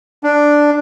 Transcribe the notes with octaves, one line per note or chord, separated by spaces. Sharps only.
D4